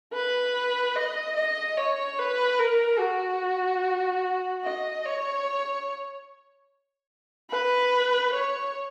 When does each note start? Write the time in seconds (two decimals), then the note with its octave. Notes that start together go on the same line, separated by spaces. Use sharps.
0.14 B4
0.96 D#5
1.36 D#5
1.78 C#5
2.19 B4
2.59 A#4
3.00 F#4
4.64 D#5
5.05 C#5
7.50 B4
8.33 C#5